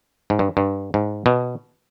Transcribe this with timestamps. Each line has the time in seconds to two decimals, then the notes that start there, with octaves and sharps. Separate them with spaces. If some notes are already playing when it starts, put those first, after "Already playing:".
0.30 G#2
0.39 G2
0.57 G2
0.94 G#2
1.26 B2